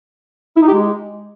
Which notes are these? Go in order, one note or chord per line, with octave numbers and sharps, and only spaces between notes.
E4
D#4
G4
G#3